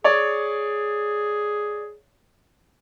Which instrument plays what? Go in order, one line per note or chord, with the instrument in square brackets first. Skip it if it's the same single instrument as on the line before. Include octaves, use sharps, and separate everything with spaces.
[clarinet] G#4 [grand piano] C#5 D5